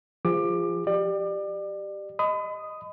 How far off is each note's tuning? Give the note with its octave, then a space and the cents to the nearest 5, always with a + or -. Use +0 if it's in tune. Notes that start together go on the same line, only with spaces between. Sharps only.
F3 -15 G#4 -35 D6 +20
G4 +0 D5 +30
D#5 +0 B5 +40 D#6 +0